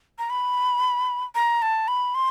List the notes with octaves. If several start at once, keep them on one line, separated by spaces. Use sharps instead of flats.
A#5
B5
A#5
A5
B5
C6